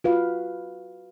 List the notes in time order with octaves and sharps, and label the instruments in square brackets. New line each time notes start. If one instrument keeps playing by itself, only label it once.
[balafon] F4 [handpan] F#4 B4 F5